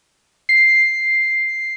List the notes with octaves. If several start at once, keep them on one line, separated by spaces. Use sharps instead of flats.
C7